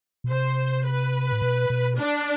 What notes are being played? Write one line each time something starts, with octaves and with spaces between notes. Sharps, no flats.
B2
C3 C5
B4
A2
B2
B2
D4